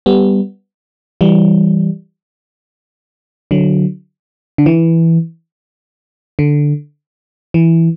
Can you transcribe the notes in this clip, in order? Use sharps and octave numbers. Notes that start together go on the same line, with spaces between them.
G3 B3
E3 G3
D3 F#3
D3
E3
D3
E3